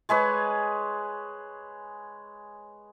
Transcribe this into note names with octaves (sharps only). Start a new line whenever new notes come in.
G#3 G#4 B4 C#5